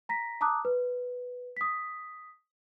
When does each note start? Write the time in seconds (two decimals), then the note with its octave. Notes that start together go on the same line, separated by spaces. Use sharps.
0.09 A#5 A#6 B6
0.41 A5 A#5 D6 D#6 F#6
0.65 B4
1.57 D#6 B6